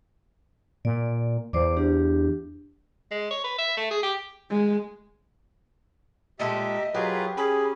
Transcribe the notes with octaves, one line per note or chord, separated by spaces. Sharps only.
A#2 D5
E2 C5 D5 D6
D4 G4
G#3
C#5
B4
E5
A3
G#4
G4
G#3
A#2 G#3 G4 A4 D#5 E5
F#3 F4 G4 G#4 A#4 B4
C#4 G#4 B5